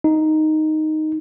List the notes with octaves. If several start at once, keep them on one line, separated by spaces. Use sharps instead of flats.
D#4